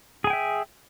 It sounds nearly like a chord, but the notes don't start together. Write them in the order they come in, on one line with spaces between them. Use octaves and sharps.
G#4 G#5 G5 E5